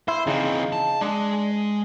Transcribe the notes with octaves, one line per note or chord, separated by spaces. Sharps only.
E4 C5
C#3 E3 C4 D#4
A5
G#3 D4